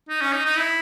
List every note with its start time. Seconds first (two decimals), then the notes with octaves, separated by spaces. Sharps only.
0.09 D#4
0.21 C#4
0.33 D#4
0.46 D#4
0.57 E4